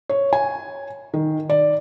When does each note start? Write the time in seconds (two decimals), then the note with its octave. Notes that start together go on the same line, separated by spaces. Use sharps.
0.09 C#5
0.33 G#5
1.14 D#3
1.49 D5